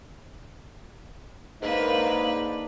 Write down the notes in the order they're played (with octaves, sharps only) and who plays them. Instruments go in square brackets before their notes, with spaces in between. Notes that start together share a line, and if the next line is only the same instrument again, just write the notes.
[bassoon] G#2 [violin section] A#3 [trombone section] D4 D#4 [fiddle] B4